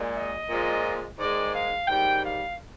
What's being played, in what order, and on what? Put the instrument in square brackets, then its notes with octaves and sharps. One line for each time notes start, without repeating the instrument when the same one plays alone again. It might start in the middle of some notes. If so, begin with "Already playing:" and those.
Already playing: [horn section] A#2 G#3
D#5
A#2 F3 G#3
G#2 D#3 G#3 D5
F5
G#2 D#3 G3 G5
F5